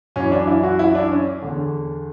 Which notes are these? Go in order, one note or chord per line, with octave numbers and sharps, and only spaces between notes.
F#2 E3 C#4
D4
E4
F#4
E4
D4
C#4
E2 D3